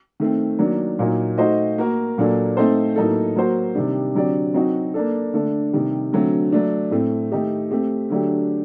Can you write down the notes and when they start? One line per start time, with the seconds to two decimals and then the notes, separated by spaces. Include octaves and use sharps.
0.20 D#3 A3 C4
0.59 D#3 F#3 A#3 D4
0.99 A#2 F#3 A#3 D#4
1.38 A3 D#4 F#4 C5 D#5
1.78 A#3 F#4 A#4
2.18 A#2 F#3 A#3 D4 A4
2.57 A3 C4 D#4 A4 C5
2.96 A2 F#3 A#3 D#4 A4
3.36 F#3 A#3 F#4 C5
3.75 C3 D#3 G3 D4
4.15 D3 F#3 C4 G4 D5
4.54 F#3 C4 D#4 F#4
4.94 A#3 D4 A4
5.34 D3 A3 D4 A4
5.73 C3 D#3 G3
6.13 D3 F#3 A3 C4 F#4
6.53 F#3 A3 D4
6.91 A2 A3 C4
7.32 D#3 A3 D#4 G4
7.71 A3 C4 G4
8.10 D3 F#3 A3 D4 G4